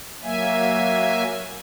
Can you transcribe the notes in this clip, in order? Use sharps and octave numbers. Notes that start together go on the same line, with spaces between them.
F#3 A#3 E5 G#5